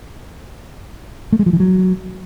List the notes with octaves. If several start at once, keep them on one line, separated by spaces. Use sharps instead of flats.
A3
G#3
F3
E3
F#3